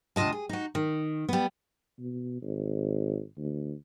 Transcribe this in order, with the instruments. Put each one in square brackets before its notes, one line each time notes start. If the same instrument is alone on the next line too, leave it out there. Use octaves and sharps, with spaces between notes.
[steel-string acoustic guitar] D2 C3 F4 D#5 A5
G#4
D#4 F#4
D#3
G3 B3
[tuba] B2
G#1
D2